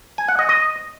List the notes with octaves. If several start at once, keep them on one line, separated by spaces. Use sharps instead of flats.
G#5
F#5
D#5
D#5